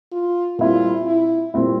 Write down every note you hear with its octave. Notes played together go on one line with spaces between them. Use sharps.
F4
A#2 G3 C4 E4 F4
E4
A#2 G3 C4 E4